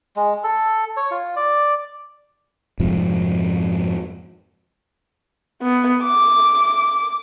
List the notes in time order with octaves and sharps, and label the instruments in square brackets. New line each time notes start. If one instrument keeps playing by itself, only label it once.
[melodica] G#3
A4
C#5
F4
D5
[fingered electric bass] F2 G#2 C3 F3
[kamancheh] B3
D6